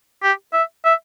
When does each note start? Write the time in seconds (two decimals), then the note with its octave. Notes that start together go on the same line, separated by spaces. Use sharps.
0.23 G4
0.53 E5
0.84 E5